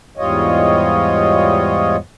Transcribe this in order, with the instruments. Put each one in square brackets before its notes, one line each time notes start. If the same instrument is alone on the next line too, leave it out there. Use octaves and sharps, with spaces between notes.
[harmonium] E2 G#2 G3 F4 C#5 D#5